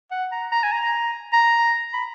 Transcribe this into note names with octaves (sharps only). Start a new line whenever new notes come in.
F#5
A#5
A#5
G#5
A#5
A#5
B5